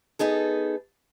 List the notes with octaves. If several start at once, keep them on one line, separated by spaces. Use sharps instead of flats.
B3 D#4 G#4 A4